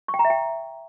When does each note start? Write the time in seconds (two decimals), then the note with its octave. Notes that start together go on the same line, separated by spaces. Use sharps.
0.08 C#6
0.14 G5
0.19 A#5
0.25 E5
0.30 G5